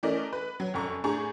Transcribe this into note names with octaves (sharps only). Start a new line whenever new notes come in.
E3 A3 C#4 A#4 D5 D#5
B4
F#3
F1 F#2 A#5 C#6
A2 D4 G#4 A#5 C#6